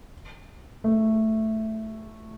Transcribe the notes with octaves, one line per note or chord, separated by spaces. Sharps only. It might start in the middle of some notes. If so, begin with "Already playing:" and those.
A3